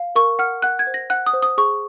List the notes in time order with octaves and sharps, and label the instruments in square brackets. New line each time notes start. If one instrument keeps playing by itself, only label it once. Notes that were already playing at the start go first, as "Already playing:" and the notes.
Already playing: [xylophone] F5
A#4 C#6
F#5 F6
F#5 F#6
G#6
C5
A#6
F#5 F#6
D#6
C5
D#6
G#4 C#6